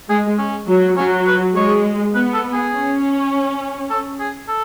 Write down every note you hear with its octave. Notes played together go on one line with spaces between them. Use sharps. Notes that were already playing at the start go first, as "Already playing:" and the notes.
G#3 G#4
C#4
F#3
F#3 C#4
B4
G#3 C#5
B3 B4
A4
G#4
C#4
A4
G#4
A4